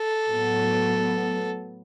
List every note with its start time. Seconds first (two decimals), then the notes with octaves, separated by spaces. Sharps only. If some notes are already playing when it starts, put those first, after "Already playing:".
Already playing: A4
0.27 A2 F#3 B3